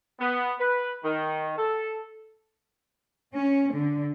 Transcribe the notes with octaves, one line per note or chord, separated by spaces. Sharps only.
B3
B4
D#3
A4
C#4
D3